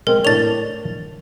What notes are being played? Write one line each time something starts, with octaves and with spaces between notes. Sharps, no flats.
G#3 C4 A#4
A2 D4 C#5 A6 F7